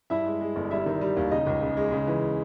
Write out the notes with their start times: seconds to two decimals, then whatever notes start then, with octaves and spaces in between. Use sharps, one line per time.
0.10 G2 E4 E5
0.26 G#3
0.41 G#3
0.56 G1
0.71 G3 E4 E5
0.86 D#3
1.01 G3
1.17 D#2
1.31 C#3 D#4 D#5
1.47 C#2
1.62 C#3
1.77 G#3
1.92 C#3
2.07 E3